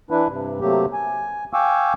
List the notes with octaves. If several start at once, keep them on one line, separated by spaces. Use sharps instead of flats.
E3 D4 E4 B4
G2 C3
C3 F#3 A3 A#3 C4 G4
G#5
F5 G5 G#5 C#6 D6 E6